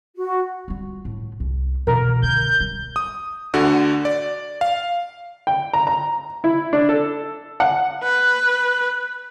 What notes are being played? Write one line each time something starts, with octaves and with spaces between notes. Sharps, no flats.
F#4
G3 F4
A2
C2
B2 E3 A#4
F2 D3 G6
G3
D#6
D2 D3 F#4
D5
F5
G5
A#5
A#5
E4
D4
A4
F#5
B4